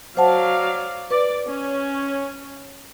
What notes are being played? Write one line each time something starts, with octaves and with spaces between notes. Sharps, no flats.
F#3 C5 D5 F5 F#5 A5
B4 D5
C#4